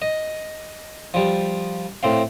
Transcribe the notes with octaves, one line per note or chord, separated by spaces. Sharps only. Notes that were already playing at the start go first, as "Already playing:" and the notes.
D#5
F3 G3
A2 C4 F5